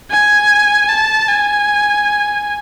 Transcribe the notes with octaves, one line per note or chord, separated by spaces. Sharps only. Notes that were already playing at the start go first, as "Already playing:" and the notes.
G#5
A5
G#5